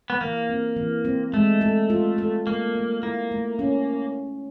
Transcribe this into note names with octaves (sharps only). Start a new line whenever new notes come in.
B3
E3 A#3
C4
E3
C4
G#3 A3
A4
F4
A4
A3 A#3
A3
A#3 E4
A3
C#4